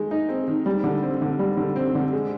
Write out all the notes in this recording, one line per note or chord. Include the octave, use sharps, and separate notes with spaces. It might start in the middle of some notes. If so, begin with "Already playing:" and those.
Already playing: D#3 G#3
D#4
C4
D#3
G3
D3
C4
D3
G3
D3
C4
D3
G#3